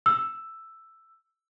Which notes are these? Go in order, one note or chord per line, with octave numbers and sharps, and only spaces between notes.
E6